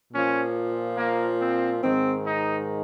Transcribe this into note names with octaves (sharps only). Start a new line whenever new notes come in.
A#2 F3 C#4
A#3
C4
G#2 D#3 C4
D#4